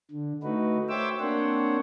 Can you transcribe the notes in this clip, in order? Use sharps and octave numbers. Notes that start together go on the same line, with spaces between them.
D3
A3 D#4 F#4 B4
C5 C#5 E5 G5 D6 E6
A#3 C4 D4 C5 C#5 F#5